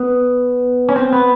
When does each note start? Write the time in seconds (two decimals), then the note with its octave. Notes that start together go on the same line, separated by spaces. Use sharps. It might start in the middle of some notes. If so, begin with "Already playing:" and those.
Already playing: B3
0.89 C#4
0.96 C4
1.13 B3